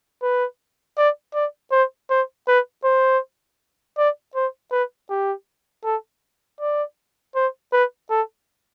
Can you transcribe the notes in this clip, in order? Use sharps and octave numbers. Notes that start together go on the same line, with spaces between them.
B4
D5
D5
C5
C5
B4
C5
D5
C5
B4
G4
A4
D5
C5
B4
A4